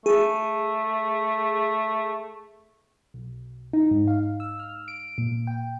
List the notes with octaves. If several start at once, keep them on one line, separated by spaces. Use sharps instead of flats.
A3 G#4
B1
D#4
G#2
F5
E6
F6
D7
A#2
G5